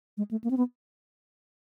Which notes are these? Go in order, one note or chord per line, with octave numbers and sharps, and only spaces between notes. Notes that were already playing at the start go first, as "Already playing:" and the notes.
G#3
A3
A#3
C4
B3